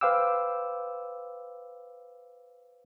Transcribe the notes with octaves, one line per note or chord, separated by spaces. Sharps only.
B4 C5 F5 G5 D6 E6